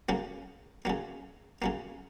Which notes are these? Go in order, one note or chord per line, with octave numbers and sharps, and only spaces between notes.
C#3 F#3 A#3
C#3 F#3 A#3
C#3 F#3 A#3